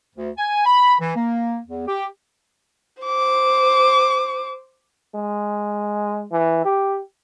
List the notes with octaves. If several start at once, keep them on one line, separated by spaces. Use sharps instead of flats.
D2
G#5
B5
E3
A#3
E2
G4
C5 D6
G#3
E3
G4